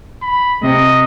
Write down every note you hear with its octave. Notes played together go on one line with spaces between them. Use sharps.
B5
C3 D#5